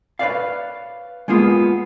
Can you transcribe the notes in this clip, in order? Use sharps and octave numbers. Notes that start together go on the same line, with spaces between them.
B4 C#5 D5 F5
G#3 A#3 B3 F4 G#4